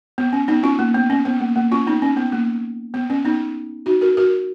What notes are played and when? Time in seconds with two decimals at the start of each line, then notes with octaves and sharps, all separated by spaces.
0.18 B3
0.33 C#4
0.48 B3 D#4
0.63 C#4 F4
0.79 A#3
0.94 B3
1.10 C#4
1.25 B3
1.40 A#3
1.56 A#3
1.72 C#4 F4
1.87 B3 D#4
2.02 C#4
2.17 B3
2.32 A#3
2.94 B3
3.10 C#4
3.25 B3 D#4
3.86 D#4 F#4
4.01 F#4 A#4
4.17 F#4 A#4